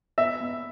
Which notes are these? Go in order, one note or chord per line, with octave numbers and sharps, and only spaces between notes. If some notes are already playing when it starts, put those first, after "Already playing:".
B3 E5
B3